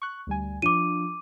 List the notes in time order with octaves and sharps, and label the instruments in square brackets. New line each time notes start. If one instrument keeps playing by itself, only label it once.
[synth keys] C#6 F#6
D2 G3 G#5
[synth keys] F3 D4 F4 [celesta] D6 D#7